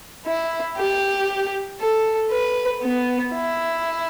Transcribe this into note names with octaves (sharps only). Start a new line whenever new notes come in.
E4
G4
A4
B4
B3
E4